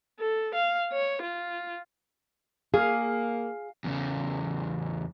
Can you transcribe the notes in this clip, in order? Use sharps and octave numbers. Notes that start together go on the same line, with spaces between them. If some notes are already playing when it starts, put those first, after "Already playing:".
A4
F5
C#5
F4
A#3 G#4 F5
E2 C#3